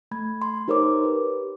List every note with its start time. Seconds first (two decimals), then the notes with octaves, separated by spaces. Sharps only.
0.11 A3 B5 G#6
0.42 C6
0.68 D#4 G4 A#4 C5 C#5 D6
1.04 G4 B4